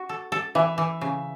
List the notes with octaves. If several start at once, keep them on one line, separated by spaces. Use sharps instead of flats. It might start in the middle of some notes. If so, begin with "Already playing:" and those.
Already playing: F#4
A4
A4
E3 E5
E3
C#3